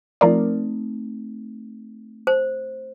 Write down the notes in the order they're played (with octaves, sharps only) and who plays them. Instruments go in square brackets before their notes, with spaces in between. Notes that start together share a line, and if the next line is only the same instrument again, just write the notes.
[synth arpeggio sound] F3 A#4 D5 [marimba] A3 C4 D#4
[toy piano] C5